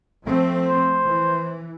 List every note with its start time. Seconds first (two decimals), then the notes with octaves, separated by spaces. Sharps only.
0.24 F3 A3 C4
0.66 C5
1.05 E3